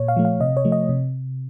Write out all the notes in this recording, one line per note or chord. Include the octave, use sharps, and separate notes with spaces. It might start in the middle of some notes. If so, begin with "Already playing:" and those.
Already playing: A#2 C#5
F5
F3 A3
F5
C3 D#5
C#5
F3 A3
D#5
C3